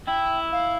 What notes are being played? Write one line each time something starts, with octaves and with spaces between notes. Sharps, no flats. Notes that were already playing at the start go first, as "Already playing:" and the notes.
E4 G5
F5